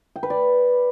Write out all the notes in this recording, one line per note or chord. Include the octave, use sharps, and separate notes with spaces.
G5
B4
D5